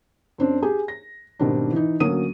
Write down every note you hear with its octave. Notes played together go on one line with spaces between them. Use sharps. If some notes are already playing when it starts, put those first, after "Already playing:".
F#2 C4 D4
G4 G#4 G#5
A#6
G#2 B2 D#3 G3 C4 D4
E3 D#4
D2 F#3 A#3 C#4 D#6 D#7